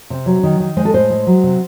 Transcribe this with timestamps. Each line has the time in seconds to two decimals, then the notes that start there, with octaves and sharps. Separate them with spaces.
0.10 C3
0.26 F#3
0.43 D#3
0.60 D#3
0.77 G#3 C5
0.85 A4
0.94 A2 C5
1.10 G#3
1.27 F#3
1.43 C3